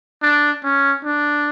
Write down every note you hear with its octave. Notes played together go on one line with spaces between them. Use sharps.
D4
C#4
D4